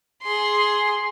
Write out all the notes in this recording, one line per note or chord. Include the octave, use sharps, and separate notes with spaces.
G#4 C6